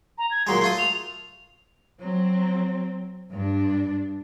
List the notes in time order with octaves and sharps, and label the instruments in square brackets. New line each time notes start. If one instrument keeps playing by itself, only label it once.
[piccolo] A#5
G#6
[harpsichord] A#2 F#3 G#3 [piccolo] C6
[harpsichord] A3 F4 D#6
[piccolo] F7
[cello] F#3 C4
G2 D4